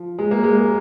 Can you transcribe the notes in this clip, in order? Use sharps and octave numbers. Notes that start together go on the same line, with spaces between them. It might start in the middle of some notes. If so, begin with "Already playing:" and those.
Already playing: F3
G#3
A#3
G#3
A#3